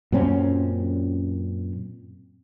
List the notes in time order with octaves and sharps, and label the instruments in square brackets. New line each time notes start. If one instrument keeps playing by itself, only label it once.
[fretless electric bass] F#2 A#2 C4 C#4